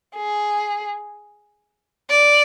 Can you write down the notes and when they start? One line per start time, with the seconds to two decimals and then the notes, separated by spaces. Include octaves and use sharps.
0.16 G#4
2.10 D5